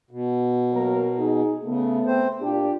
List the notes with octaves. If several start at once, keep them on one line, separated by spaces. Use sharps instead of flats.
B2
F#3 A#3 A#4
D#4 G#4
C#3 A3 B3
C4 C5
A#2 D4 F4 G4